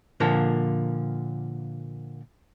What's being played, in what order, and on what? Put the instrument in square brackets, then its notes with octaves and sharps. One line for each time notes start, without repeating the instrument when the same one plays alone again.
[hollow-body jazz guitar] A#2 D3 F3 A#3